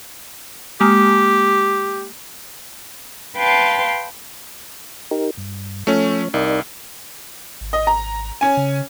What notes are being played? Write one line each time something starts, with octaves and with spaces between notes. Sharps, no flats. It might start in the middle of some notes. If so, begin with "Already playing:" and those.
G#3 A#3 G4
B4 F5 G5 A5 C6
D#4 G4 A#4
G2
F3 A3 C#4 C#5
C2 D#4 A#4 D5
G#1
D#5
A#5
C#4 G#5
C#3